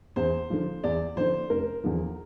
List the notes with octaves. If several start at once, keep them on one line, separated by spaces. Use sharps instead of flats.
E2 C5
D3 F3
E2 D5
D3 F3 C5
F1 A#4
E2 D3 F3